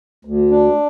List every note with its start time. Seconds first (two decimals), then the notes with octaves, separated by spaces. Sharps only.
0.25 D2
0.51 D4